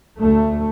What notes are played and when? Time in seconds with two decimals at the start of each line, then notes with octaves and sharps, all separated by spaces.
0.20 D2 A3